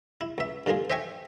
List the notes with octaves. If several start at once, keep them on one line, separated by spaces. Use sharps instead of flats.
E4
C#2 E5
G2 D3 A#3 F4 G#4
C5 D#5 E5 G5 G#5 C#6